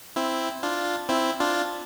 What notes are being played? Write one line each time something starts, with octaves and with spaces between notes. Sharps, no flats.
C4 E4
D4 F4
C4 E4
D4 F4